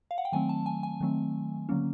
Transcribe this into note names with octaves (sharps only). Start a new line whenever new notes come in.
F5
F#5
G5
D#3 F#3 A3 C4 G#5
A5
G#5
G#5
D#3 F#3 A3 C4
D3 F#3 A#3 C#4